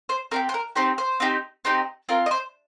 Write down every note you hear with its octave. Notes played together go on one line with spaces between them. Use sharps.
C5
C4 D#4 G4 A#4
C5
A#4
C4 D#4 G4 C5
C5
C4 D#4 G4
C4 D#4 G4
C4 F4 A#4
D#5
C5